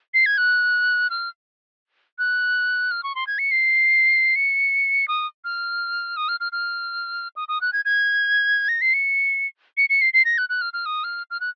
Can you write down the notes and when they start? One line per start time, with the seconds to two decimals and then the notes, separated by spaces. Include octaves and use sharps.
0.14 C7
0.26 G#6
0.38 F#6
1.10 F6
2.19 F#6
2.91 F6
3.03 C#6
3.15 C6
3.27 G#6
3.39 C#7
3.51 C7
4.36 C#7
5.08 D#6
5.44 F6
6.17 D#6
6.28 F6
6.40 F6
6.52 F6
7.36 D#6
7.48 D#6
7.61 F#6
7.73 G#6
7.85 G#6
8.69 A#6
8.81 C7
8.94 C#7
9.77 C#7
9.90 C#7
10.01 C7
10.14 C7
10.25 A#6
10.38 F#6
10.49 F#6
10.61 F6
10.73 F6
10.86 D#6
11.04 F6
11.31 F6
11.40 F#6